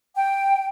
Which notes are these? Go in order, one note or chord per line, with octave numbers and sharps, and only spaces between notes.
G5